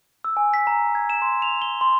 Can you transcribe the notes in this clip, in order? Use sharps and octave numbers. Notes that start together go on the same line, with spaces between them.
E6
G#5
B6
A#5
G#6
E7
C6
F7
G7
C6